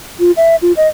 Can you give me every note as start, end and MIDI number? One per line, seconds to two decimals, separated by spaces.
0.19 0.31 65
0.37 0.56 76
0.62 0.72 65
0.77 0.88 75